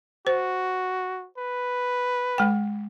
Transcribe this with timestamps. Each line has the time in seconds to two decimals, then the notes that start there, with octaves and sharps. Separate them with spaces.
0.27 F#4 C5
1.38 B4
2.38 G#3 G5